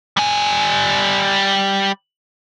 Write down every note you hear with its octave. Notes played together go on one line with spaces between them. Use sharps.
G3 G#5